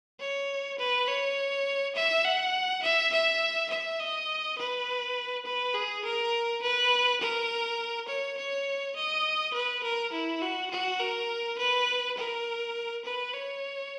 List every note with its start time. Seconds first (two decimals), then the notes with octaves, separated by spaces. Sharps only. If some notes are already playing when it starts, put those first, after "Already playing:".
0.20 C#5
0.79 B4
1.08 C#5
1.95 E5
2.25 F#5
2.83 E5
3.13 E5
3.70 E5
4.00 D#5
4.58 B4
5.45 B4
5.74 G#4
6.04 A#4
6.62 B4
7.21 A#4
8.08 C#5
8.37 C#5
8.96 D#5
9.54 B4
9.83 A#4
10.13 E4
10.42 F#4
10.71 F#4
11.00 A#4
11.58 B4
12.17 A#4
13.04 B4
13.34 C#5